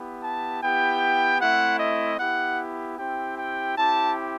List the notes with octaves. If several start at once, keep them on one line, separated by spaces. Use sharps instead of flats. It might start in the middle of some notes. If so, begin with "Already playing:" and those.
Already playing: B3 E4 G4
A5
B3 E4 G4 G5
A3 C4 E4 F#5
D#5
B3 E4 G4 F#5
C4 E4 G4 G5
G5
C4 E4 G4 A5